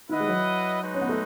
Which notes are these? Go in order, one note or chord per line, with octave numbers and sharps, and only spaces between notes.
D#3 E4 B4 D#5 F#5
G#3
F#3
G#3 D#4 F#4 B4
C#4
B3
A3